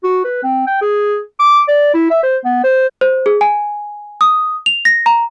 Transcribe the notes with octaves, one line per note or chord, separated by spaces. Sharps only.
F#4
B4
C4
G5
G#4
D6
D5
E4
E5
C5
B3
C5
C5
G#4
G#5
D#6
F7
A#6
A#5